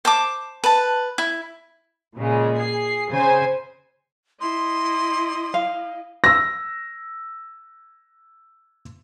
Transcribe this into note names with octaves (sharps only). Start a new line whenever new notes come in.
C5 A5 D6
B4 A5
E4
A#2 C#3 G#3
G#4 C7
C#3 C5 G#5
E4 D#5 C6
F5
E6 A#6